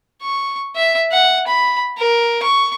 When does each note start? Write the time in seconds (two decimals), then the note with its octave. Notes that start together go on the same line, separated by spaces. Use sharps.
0.22 C#6
0.75 E5
1.11 F#5
1.47 B5
1.98 A#4
2.42 C#6